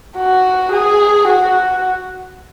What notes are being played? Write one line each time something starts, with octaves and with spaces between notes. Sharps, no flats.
F#4
G#4
F#4